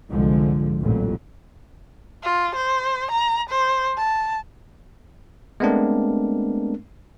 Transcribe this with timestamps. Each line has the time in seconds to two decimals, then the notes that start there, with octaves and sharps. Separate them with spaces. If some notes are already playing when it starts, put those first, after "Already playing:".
0.11 C2 F2 G#2 D3 F3 G#3
0.81 A1 F2 A#2 F#3
2.23 F4
2.55 C5
3.11 A#5
3.49 C5
3.97 A5
5.60 G#3 A3 B3 C4 D4 A#4